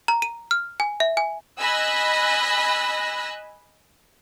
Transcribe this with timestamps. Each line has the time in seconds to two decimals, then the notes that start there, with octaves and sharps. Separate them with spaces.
0.08 A#5
0.22 D#7
0.51 F6
0.80 G#5
1.00 E5
1.17 G#5
1.59 D#5 G#5 B5 E6 F#6 A#6